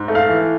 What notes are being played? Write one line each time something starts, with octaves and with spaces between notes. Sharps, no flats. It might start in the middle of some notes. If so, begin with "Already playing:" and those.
Already playing: G#2
A3
F5
E3